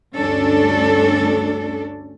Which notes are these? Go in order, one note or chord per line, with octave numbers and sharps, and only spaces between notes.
D2 G2 C#4 D4 A4